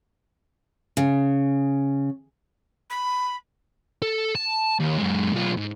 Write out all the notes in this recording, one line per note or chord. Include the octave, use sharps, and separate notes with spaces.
C#3
B5
A4
A5
D#2
F#2 G#3
B1 F4
G#2